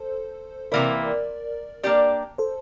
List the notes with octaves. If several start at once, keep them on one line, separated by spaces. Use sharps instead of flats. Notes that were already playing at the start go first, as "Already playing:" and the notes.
Already playing: A4 C5
C3 E3 A#3 E4 A#4 D5
A#3 D4 G4 D5
A4 C5